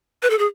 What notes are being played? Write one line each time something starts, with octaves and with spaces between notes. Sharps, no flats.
B4
A4
G#4